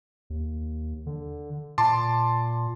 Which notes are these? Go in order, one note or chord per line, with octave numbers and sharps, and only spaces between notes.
D#2
D3
A#2 A5 C6 D6